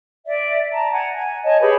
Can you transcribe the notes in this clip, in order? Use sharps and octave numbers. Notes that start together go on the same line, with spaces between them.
D5 E5
A5 A#5
F#5 G#5
G#5
C#5 D#5 G#5 A5
G4 G#4 B4 C#5